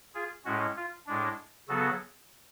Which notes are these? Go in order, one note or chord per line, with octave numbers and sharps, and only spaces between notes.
F4 G#4
A2 G#3 C#4 F#4
F4
A2 G#3 D4
C#3 F#3 B3 F#4 A4